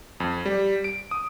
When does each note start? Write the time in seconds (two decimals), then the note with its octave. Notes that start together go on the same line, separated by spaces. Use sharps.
0.20 F2
0.46 G3
0.84 D7
1.11 D#6